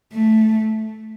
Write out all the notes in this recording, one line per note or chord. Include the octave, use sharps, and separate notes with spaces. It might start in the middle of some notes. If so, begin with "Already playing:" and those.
A3